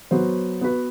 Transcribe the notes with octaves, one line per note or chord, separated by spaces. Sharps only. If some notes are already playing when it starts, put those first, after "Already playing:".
F#3 B3 F#4 C5
B3 F#4 B4